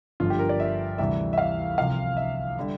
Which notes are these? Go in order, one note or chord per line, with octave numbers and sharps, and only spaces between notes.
G1 G2 D3 F3 F4
G4
A#4
D5
E5
D2 C3 E3 G3 E5
E5
F5
C2 C3 F3 F5
E5
D3 G3